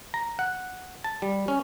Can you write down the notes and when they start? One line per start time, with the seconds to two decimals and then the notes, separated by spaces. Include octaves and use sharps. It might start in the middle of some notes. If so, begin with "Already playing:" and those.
0.14 A#5
0.39 F#5
1.04 A5
1.22 G3
1.48 C#4